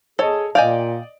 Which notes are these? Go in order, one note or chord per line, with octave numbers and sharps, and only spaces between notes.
G#4 A4 C#5 D#5
A#2 D5 D#5 F5 G5 G#5